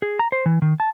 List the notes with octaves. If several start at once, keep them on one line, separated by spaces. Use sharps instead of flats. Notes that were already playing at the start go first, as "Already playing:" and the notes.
G#4
A#5
C5
E3
D#3
A5